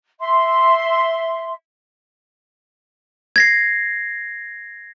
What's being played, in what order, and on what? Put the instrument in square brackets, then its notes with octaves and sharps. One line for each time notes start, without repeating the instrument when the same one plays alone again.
[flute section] E5 C6
[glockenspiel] G#6 A#6 C7